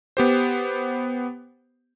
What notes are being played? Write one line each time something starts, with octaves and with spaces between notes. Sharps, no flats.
B3 G4 C5